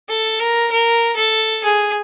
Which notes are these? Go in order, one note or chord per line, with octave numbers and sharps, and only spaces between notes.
A4
A#4
A#4
A4
G#4